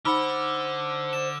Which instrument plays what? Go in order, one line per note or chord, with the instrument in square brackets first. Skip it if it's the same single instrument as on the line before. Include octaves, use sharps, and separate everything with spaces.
[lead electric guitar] D3 F#5 [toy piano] D#4 B5 [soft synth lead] C5 [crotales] D6 E6 F6
[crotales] E7